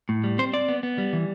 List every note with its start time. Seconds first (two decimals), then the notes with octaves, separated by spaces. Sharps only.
0.09 A2
0.24 G3
0.38 C4 C5
0.53 C4 D5
0.68 B3
0.83 B3
0.98 G3
1.13 E3